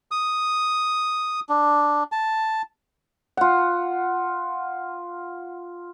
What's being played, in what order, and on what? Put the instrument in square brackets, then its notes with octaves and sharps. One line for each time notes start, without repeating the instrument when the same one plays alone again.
[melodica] D#6
D4
A5
[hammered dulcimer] F4 F#5